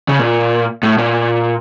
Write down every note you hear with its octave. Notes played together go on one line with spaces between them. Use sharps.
C#3
A#2
A2
A#2